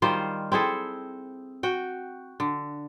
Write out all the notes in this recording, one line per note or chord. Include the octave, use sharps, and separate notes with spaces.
D#3 G3 F4 C5
C4 E4 G#4 A4
F#4 G5
D3